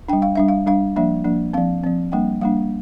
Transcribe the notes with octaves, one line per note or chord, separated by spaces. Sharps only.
G3 D4 G5
F5
G3 D4 E5
F5
G3 D4 F5
F3 A#3 D4 E5
F3 A#3 D4
F3 C4 F5
F3 C4
G3 A#3 D4 G5
G3 A#3 D4 F5